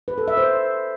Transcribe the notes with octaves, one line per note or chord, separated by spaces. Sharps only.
B4
A4
E5
C5